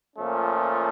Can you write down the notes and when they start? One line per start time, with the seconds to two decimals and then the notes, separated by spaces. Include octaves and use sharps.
0.16 A#2 F3 A3 C#4